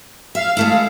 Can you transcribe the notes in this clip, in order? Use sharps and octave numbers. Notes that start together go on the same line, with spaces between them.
E5 F5
G#3 A3 E4